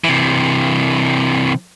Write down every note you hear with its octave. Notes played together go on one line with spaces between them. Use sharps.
C3 E3